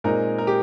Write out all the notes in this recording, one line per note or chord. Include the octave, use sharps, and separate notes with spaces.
A#2 G#3 C4 D#4 A#4
A#4
G4